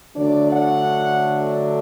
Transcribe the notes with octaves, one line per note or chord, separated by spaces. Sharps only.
D3 F#3 A3 D4 D5
F#5